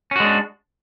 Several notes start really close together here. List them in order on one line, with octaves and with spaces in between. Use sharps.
C#4 F#4 G#3 D4